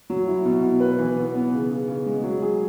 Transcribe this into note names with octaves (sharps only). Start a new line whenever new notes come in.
F#3
E4
B2
B2
B4
E3
B3
B3
C#3
C#3
C#3
G#3
F#3
G#4